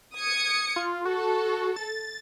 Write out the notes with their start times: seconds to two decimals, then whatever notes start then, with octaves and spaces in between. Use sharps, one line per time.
0.16 D#6 G#6 C#7
0.76 F4
1.05 F#4 A4
1.76 A6